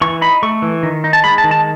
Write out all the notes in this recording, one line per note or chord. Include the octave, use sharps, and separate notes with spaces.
E3 C#6
D#4 B5
A3 C#6
E3
D#3
D#4
A5
G#3 B5
A5
D#3
A5